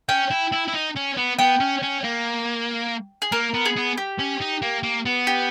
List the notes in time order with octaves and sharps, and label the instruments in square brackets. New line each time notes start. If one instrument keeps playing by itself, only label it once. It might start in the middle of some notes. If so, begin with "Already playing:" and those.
[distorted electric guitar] C#4 [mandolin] G5
[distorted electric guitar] E4
E4
E4
D#4
C#4
B3
[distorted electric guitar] B3 [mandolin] G5
[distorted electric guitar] C#4
C#4
A#3
[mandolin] G#4
[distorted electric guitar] A#3 [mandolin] A#4
[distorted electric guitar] B3
[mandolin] G#4
[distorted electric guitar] B3
[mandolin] G4
[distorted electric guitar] C#4
D#4
A#3
A#3
B3
[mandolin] G4